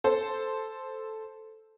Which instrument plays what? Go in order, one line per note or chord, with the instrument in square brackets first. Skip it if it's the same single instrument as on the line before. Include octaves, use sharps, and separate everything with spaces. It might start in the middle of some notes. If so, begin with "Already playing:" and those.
[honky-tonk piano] A4 C5